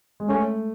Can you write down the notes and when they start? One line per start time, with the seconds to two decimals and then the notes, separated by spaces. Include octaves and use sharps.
0.20 G#3
0.29 A3 C#4